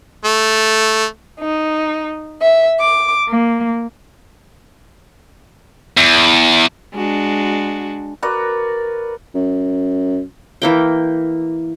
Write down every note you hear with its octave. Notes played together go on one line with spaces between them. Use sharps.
A3
D#4
E5
D6
A#3
E2
G#3 D4 F#4
F#4 A#4 B4 D5
F#2
E3 A#3 G5